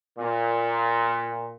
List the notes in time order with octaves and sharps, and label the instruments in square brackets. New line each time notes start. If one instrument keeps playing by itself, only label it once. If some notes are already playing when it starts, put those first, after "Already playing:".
[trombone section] A#2